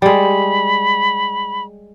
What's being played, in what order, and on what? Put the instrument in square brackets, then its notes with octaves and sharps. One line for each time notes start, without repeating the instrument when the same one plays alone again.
[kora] G3 G#3 [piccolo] B5